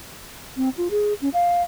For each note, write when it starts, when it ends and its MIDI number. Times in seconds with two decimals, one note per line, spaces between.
0.57 0.69 60
0.77 0.88 65
0.91 1.14 68
1.22 1.29 61
1.34 1.62 77